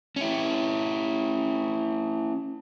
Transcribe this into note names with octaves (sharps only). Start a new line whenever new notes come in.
C#4 E4